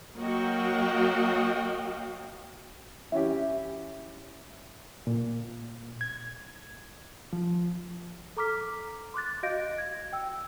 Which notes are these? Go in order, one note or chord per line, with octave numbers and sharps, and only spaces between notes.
F#3 A#3 F#4 D#5 F5 G5
E3 C#4 G4 E5
A#2
G#6
F3
A4 A#5 D6 F6 B6
C6 D6 F#6 A6
F#4 D#5 F5 G6 A#6 D7
G#6
G5 E6